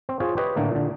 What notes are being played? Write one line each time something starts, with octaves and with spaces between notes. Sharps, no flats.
C4
F4 G#4 C5 C#5
G4 B4 C#5 D#5
A2 D3 A3 A#3
A#2 D3